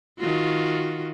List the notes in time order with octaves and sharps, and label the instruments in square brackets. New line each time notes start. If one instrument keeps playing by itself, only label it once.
[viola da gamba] D#3 F4 F#4